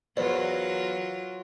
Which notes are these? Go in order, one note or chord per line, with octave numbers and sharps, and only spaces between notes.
E2 F#3 F4 A#4 C5 D5